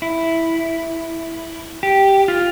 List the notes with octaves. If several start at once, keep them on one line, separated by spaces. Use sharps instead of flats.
E4
G4
F4